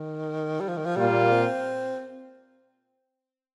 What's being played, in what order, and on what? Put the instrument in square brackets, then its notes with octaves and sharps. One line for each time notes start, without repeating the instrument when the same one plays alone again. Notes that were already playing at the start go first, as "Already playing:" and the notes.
Already playing: [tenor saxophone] D#3
G3
F3
D#3
F3
[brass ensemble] A#2 A#3 F4 [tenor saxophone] G3
[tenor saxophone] C4